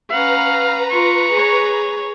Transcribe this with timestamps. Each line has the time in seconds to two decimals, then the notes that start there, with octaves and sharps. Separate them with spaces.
0.10 C#4 B4 F5 F#5 A#5
0.91 F4 C#6
1.32 G#4 C#5